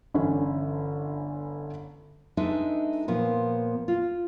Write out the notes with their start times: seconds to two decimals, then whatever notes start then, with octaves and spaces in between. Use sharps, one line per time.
0.14 G1 D3 E3 C#4
2.37 G#3 D4 D#4 A4 B4 E5
3.08 A#2 F3 B3
3.88 F4